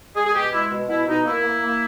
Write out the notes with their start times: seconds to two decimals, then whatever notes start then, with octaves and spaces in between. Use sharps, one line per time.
0.15 G#3 G#4
0.27 G#4
0.34 B2 G4
0.52 G#3 E4
0.70 B2
0.89 B2 E4
1.07 B2 D#4
1.25 A#3 E4
1.44 A#3
1.62 A#3